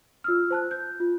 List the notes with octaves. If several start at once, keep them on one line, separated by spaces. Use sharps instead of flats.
F4 E6 F6
C5 A5 F#6
G6
F4